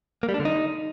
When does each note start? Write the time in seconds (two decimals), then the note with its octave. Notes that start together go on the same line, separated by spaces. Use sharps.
0.23 A#3
0.29 G3
0.34 D4
0.40 D3
0.45 D#4